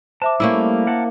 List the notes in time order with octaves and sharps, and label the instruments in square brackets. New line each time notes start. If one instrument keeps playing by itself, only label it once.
[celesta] C5 E5 D6 [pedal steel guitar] A5
[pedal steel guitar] G3 A3 [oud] A#3 C#4 E4
[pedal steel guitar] A#4 F#5 A5